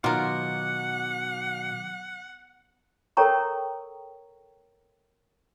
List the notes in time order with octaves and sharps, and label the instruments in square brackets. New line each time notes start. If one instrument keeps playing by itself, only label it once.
[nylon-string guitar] B2 [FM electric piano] D#3 F#3 D6 [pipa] F4 A#4 [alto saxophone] F#5
[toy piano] A4 A#4 C#5 G5 A#5 C#6